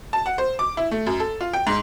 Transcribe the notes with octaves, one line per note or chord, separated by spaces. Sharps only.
A5
F#5
C5
D6
E4
A3
F#2
A4
F4
G5
G#2